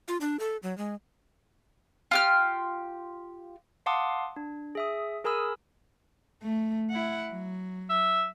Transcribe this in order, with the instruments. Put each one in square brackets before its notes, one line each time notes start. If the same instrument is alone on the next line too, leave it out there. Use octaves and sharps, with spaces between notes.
[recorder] F4
D4
A4
F#3
G#3
[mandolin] F4 G4 F6
[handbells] F5 F#5 A5 C6 D6 D#6
D4
G#4 E5 D#6
G#4 A#4 G#5 B5 D#6 E6
[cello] A3
E4 F#5
F#3
[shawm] E5